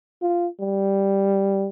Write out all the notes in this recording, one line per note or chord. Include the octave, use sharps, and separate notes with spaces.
F4
G3